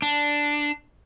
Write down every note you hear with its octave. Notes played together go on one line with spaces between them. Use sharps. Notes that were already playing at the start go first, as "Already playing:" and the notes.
D4